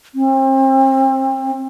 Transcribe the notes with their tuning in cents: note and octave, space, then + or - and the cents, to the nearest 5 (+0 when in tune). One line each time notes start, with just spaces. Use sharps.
C4 +35